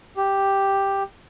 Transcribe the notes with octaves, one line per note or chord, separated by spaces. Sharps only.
G4